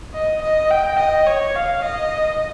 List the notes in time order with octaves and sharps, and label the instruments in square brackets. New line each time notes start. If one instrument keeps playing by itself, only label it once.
[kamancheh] D#5
D#5
G5
D#5
C#5
F5
D#5